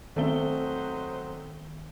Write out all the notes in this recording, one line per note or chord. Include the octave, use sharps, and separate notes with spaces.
D#3 F#3 A3 B3 C4 D#4 C5 G7